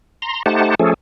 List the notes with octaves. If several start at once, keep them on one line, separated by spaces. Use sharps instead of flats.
A#5 C6
A3 D#4 G4 C5 F#5 A5
F3 A3 C#4 G#4 A4